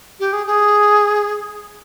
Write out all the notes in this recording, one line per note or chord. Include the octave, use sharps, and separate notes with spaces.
G4
G#4
G#4